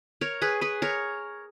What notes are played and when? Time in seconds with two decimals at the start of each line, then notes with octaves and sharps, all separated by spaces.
0.21 A#4 C#5
0.42 G#4 B4
0.61 G#4 B4
0.82 A#4 C#5